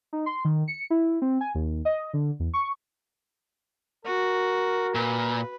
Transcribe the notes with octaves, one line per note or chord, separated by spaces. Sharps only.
D#4
C6
D#3
C#7
E4
C4
G#5
D#2
D#5
D3
E2
C#6
F#4 A#4
A#2 B4